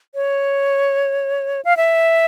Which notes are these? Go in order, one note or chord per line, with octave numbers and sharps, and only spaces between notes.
C#5
F5
E5